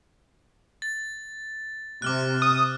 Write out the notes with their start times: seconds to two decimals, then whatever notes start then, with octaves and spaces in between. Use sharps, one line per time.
0.82 A6
2.02 C3 D6 F6 F#6
2.42 D#6